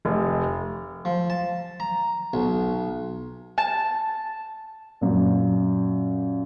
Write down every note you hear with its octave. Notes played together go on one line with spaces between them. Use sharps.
F1
F3
A5
A#5
B1
A5
F#2 A#2